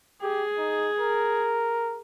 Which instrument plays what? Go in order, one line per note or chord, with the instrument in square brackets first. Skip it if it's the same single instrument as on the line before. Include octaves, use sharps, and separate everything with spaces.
[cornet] G4 [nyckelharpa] G#4
[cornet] D#4
A#4